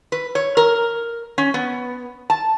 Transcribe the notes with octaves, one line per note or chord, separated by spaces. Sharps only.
B4
C#5
A#4
C#4
B3
A5